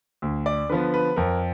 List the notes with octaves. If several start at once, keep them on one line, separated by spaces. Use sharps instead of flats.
D2
D5
D3 F3 B3 B4
B4
F2 A#4